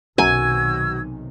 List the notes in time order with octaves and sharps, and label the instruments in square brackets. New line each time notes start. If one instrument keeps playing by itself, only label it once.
[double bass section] B1 C3 D#3 [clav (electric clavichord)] F#2 [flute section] F#4 E6 G#6 [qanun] G#5